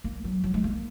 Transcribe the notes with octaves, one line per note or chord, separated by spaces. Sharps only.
A#3
F#3
F#3
G#3
A#3